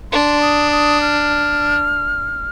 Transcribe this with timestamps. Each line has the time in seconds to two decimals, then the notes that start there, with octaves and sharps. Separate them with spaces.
0.12 D4 C6
0.42 D#6
0.72 D#6
1.01 F6